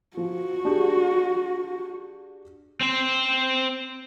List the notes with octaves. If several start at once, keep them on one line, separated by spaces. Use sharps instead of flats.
F3 F#4
D4 G4 G#4
C4 C5